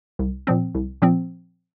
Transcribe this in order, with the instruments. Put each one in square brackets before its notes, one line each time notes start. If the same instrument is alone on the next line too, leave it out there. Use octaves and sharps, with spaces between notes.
[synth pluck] C2
A#2 F3 C4
C2
A#2 F3 C4